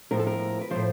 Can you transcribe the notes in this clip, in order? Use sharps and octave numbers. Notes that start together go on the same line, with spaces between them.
A2 F3 A#4
A4
A#4
B4
A2 F3 C5